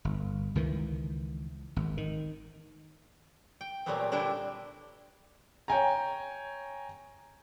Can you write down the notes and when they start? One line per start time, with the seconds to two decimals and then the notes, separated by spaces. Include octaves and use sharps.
0.05 G1
0.55 C#2 D#3 E3
1.76 G#1
1.97 D#3
3.61 G5
3.86 A#2 F#3 G3 A3 B3 C4
4.12 D3 G3 D4 E4 G5
5.68 C#5 G5 G#5 A#5